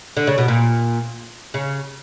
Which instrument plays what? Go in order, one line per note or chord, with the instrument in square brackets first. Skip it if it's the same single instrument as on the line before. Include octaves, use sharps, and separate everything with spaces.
[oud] D3
C#3
B2
A#2
C#3